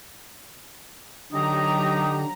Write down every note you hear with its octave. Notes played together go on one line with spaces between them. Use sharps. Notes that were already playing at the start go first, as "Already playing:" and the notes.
D3 F#3 D#4 G4 A#5 D#6